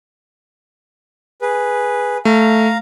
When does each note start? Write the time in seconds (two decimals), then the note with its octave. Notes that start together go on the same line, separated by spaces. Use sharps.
1.42 G#4 B4
2.25 A3 F5 A#5